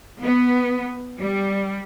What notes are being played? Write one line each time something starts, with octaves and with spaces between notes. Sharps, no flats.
B3
G3